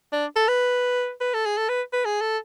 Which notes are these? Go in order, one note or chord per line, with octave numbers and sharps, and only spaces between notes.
D4
A4
B4
B4
A4
G#4
A4
B4
B4
G#4
A4